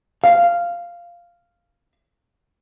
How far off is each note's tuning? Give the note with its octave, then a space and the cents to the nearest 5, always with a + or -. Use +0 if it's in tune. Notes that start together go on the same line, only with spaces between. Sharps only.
F5 -5